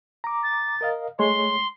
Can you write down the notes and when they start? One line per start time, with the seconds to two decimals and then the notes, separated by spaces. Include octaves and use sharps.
0.24 A#5 D6
0.43 A6
0.81 A#4 D#5 F5
1.19 G#3 A3 C#5 C6